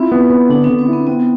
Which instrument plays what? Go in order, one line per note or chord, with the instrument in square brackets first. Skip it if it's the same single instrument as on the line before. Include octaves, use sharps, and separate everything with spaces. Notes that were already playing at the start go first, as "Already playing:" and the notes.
Already playing: [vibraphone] C4 [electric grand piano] E4 F4
[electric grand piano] B3
B3
[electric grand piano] D3 [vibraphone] D4
[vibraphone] C4
[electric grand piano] D3
[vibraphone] C4
[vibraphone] B3 [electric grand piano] E4
[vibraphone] B3 [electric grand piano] C4